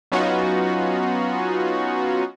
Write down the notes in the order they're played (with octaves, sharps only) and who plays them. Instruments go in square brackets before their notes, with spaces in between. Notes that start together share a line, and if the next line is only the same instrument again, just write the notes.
[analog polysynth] F#3 B3 C#4 D#4 F4 F#4